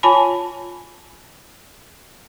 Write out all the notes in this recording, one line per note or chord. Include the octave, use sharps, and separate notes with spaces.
F4 C#5 G#5 A5 B5